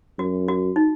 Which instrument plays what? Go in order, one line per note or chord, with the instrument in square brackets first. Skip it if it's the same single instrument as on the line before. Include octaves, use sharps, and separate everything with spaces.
[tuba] F#2 [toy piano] F#4
[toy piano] F#4
D#4